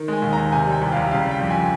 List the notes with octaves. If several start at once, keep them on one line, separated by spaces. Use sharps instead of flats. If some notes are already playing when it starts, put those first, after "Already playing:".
Already playing: D#3
G#3 G#5
D#2
A#5
D#2
C3 G#5
G3
G5
C2
G5
F5
C2
C#3 F5
G3 G5
F2
G#5